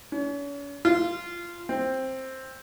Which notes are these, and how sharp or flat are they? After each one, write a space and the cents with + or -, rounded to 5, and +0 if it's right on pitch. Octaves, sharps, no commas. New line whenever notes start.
C#4 +40
F4 -15
C4 +10